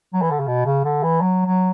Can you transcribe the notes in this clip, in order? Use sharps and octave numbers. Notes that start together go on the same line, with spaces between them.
F#3
E3
D3
C#3
B2
C#3
D3
E3
F#3
F#3